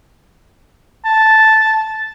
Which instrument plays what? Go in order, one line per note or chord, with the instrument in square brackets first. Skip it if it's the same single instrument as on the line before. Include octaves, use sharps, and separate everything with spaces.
[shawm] A5